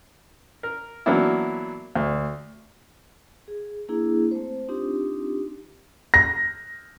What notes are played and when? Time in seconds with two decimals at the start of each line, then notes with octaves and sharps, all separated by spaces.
0.63 A#4
1.06 E3 F#3 A#3 B3 D4 E4
1.96 D2
3.48 G#4
3.89 A#3 D4 E4 G#4
4.31 A3 C4 C5
4.69 C4 D4 D#4 F4 G4
6.14 A#6